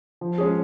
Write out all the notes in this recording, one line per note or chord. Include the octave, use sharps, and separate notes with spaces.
F3
G#3 C#4 G#4